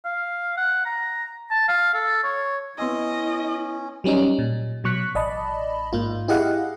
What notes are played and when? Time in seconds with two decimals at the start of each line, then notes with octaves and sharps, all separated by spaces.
0.05 F5
0.57 F#5
0.85 A#5
1.51 A5
1.68 F5
1.94 A4
2.24 C#5
2.78 B3 C#4 E4 D#5 C6 E6
4.04 F#3 G3 C#4 D#4
4.39 A#2
4.84 B2 F#3 C#6 F#6 B6
5.15 A1 D5 D#5 A5 B5
5.93 G#2 A#3 F4
6.28 E4 G4 G#4 D#5 F5 F#5